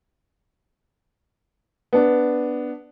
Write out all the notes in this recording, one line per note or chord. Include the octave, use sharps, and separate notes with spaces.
B3 D4